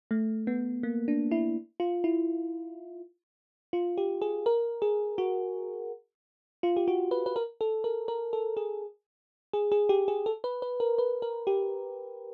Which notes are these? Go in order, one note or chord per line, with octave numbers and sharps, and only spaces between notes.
A3
B3
A#3
D4
E4
F4
E4
F4
G4
G#4
A#4
G#4
F#4
F4
G4
F#4
B4
B4
A#4
A4
A#4
A#4
A4
G#4
G#4
G#4
G4
G#4
A4
B4
B4
A#4
B4
A#4
G4